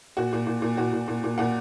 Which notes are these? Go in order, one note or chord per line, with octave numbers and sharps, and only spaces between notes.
A#2 F#4
A#2
A#2
A#2
A#2 F#4
A#2
A#2
A#2
A#2 F#5